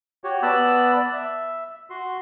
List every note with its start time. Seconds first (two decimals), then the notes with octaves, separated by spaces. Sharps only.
0.24 F#4 G4 C#5
0.43 B3 D5 A5 B5 E6 F#6
0.94 D5
1.13 E5
1.90 F#4 C6